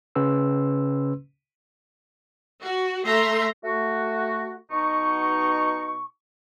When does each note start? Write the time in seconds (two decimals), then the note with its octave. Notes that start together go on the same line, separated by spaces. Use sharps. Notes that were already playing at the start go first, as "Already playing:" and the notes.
0.15 C#3 C#4 B4 C6 E6
2.61 F#4
3.04 A3 E5 A#5 C6
3.64 A3 F#4
4.71 B2 D#4 C#6